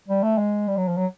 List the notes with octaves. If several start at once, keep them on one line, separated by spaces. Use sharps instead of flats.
G3
A3
G#3
G3
F#3
F3
F#3